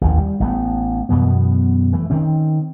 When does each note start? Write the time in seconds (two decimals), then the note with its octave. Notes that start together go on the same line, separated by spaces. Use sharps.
0.01 A1 D#2 F3
0.18 G3
0.40 A1 A3 B3
1.09 F#2 B2 E3 B3
1.93 E3 A3
2.10 D#3 C4 C#4